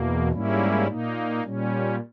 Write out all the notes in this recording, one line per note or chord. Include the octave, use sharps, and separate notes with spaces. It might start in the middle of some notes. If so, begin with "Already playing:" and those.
Already playing: E2 B2 A#3
G#2 G3 A#3 C#4 E4
A#2 A#3 D#4
A#2 G3 C#4